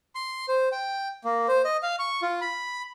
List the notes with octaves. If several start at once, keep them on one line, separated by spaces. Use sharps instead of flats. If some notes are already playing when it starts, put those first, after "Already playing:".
C6
C5
G5
A#3
C5
D#5
F5
C#6
F4
B5